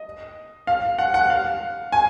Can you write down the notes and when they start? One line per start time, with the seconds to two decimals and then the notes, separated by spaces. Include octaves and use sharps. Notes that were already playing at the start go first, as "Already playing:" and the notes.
Already playing: D#5
0.67 F5
0.99 F#5
1.14 F#5
1.30 F5
1.92 G#5